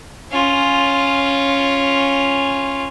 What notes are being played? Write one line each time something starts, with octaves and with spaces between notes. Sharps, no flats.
C#4 F4